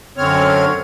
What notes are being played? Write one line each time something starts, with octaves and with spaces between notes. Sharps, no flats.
F#2 D3 C4 C#5 F6